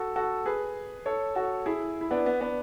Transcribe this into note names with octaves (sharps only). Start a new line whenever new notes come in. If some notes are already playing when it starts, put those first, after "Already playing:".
Already playing: F#4 A4
F#4 A4
G#4 B4
A4 C#5
F#4 A4
E4 G#4
E4
B3 D4
B3
B3 D4